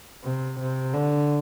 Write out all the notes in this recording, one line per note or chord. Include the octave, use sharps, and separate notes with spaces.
C3
C3
D3